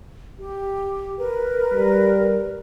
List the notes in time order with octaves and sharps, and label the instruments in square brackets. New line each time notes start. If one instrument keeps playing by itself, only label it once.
[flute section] G4
A#4 B4
[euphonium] G3